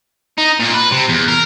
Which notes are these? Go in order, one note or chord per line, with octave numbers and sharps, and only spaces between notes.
D#4
A#2 A#3
B4
C3
E2
A#4